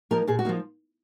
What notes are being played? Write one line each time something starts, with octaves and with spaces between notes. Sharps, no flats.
F3 A#3 D#4 A#4
A#2 G#4
F#4
F3 A#3 D#4